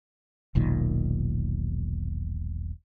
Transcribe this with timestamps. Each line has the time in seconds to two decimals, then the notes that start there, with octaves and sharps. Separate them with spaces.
0.55 E1 B1 A#2 D#3